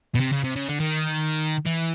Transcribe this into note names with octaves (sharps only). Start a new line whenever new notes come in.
B2
C3
C#3
C3
C#3
D3
D#3
E3